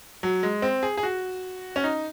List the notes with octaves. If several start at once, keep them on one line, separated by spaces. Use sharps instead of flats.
F#3
G#3
C4
G#4
G#4
F#4
C#4
D#4